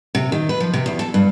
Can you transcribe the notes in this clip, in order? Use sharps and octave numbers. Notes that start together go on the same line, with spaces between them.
C3
D#3
B4
F3
C3
E2
A4
G2